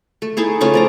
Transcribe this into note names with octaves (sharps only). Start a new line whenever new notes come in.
A3
D#4 E4 G#4 A4
C#3 A3 C#4 F4
F3 D5 A#5